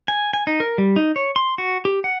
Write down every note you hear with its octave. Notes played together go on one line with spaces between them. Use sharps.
G#5
G#5
D#4
A#4
G3
D#4
C#5
C6
F#4
G4
F#5